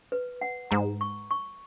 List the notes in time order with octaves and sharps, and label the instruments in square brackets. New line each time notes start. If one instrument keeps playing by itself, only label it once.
[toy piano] B4
F#5
[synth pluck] G#2 [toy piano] A#5
[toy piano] C#6
C#6